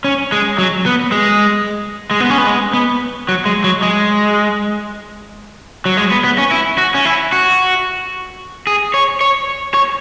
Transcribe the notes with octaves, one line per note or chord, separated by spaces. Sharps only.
C#4
G#3
F#3
B3
G#3
G#3
B3
C#4
B3
G#3
B3
F#3
G#3
F#3
G#3
F#3
G#3
B3
B3
C#4
E4
F#4
C#4
E4
F#4
G#4
C#5
C#5
C#5